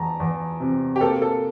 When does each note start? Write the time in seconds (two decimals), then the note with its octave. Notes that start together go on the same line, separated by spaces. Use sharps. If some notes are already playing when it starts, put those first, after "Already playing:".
Already playing: E2 A5 A#5
0.20 E2
0.60 C3
0.96 G4
1.01 A#3 A4
1.22 A4